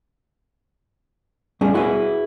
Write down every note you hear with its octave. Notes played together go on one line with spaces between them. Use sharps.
G3 C#4 G#4
E4 F#4 G#4 B4